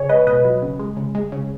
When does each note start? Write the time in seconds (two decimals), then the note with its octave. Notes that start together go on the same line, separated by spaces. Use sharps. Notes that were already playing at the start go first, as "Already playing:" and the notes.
Already playing: C#3 G#4 C#5
0.09 G#3 B4 D#5
0.27 B2 B4 D#5
0.45 F#3
0.62 C#3
0.79 G#3
0.97 C#3
1.15 G#3
1.32 C#3